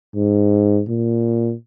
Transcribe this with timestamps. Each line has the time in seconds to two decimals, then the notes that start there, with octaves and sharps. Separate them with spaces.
0.15 G#2
0.88 A#2